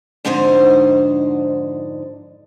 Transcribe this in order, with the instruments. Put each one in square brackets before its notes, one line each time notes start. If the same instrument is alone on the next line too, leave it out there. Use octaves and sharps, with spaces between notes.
[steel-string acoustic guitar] F2 G#2 D3 D#4 C5